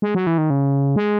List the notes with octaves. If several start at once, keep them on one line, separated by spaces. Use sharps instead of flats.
G#3
F#3
E3
D#3
C#3
G#3